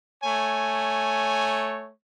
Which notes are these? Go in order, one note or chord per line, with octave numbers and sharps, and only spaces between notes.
A3 C#5 G#5